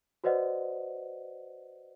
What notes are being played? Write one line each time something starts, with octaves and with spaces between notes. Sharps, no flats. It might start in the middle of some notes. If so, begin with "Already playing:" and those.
F#4 B4 C5 D5 D#5 F#5